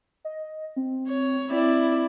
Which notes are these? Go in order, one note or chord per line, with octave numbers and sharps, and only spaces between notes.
D#5
C4
C#5
C4 E4 D5